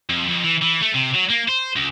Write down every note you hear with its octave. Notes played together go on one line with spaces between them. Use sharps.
F2
F2
E3
E3
A3
C3
F#3
A#3
C5
C#2